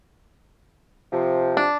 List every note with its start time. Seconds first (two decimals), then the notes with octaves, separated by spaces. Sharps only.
1.12 C3 F3
1.57 D4